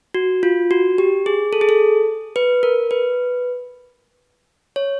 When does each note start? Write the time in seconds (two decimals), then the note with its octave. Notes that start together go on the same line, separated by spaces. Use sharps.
0.14 F#4
0.43 F4
0.71 F#4
0.98 G4
1.26 G#4
1.53 A4
1.61 G#4
1.69 A4
2.36 B4
2.63 A#4
2.91 B4
4.76 C#5